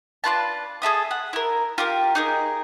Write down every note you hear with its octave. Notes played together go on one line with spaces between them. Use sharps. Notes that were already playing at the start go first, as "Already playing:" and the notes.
D4 F4 B4 A5
G#4 A4 E5 D#6
F#5
E4 A#4
F4 G4 A#4
D#4 G#4 A#4